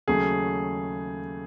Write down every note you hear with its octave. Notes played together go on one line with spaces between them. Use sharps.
D#2 C#3 F#3 A3 G#4